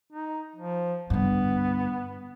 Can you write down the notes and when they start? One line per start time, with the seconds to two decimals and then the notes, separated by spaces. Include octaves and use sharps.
0.13 D#4
0.56 F3
1.10 G2 D3 B3